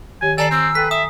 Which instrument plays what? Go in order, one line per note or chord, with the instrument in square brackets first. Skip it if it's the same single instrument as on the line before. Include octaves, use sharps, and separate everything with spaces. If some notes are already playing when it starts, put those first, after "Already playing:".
[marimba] D#3 G4 C#5 [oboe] G#5
[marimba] D#3 [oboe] A4 [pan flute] D5 [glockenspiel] G#5 A#5 C7
[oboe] C4 [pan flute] E6
[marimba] A4 G5 A6 [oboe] B4 [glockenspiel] B6
[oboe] E5 [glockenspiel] D#6